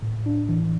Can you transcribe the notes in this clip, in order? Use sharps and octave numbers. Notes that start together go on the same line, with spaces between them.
A2
D4
E3